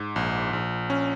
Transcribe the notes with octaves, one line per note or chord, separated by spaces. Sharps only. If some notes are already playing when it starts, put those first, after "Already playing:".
Already playing: G#2
A#1
A#1
C#4